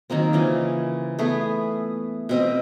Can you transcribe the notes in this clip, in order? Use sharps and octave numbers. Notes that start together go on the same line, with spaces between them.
D#3 F#3 A#3 C4
C#3 E3 F4
A3 B3 G#4
B2 C4 D#5